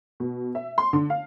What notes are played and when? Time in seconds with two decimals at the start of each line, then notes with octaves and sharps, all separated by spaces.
0.20 B2
0.55 E5
0.78 C6
0.93 D3
1.10 F5